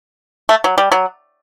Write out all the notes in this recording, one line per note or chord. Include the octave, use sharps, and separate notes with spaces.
A3
F#3
G3
F#3